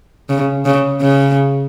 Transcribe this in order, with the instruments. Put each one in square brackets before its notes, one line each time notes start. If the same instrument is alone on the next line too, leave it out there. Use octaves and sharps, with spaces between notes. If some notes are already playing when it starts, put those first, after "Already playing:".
[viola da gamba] C#3
C#3
C#3